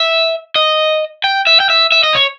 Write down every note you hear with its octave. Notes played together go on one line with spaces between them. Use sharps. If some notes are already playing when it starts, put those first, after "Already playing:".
Already playing: E5
D#5
G5
E5
G5
E5
E5
D#5
C#5